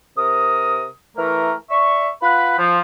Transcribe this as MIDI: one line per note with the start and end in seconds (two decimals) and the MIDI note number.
0.17 0.87 48
0.17 0.87 70
0.17 0.87 87
1.17 1.53 52
1.17 1.53 57
1.17 1.53 70
1.70 2.07 74
1.70 2.07 76
1.70 2.07 85
2.22 2.55 65
2.22 2.55 71
2.22 2.55 78
2.22 2.55 83
2.58 2.79 53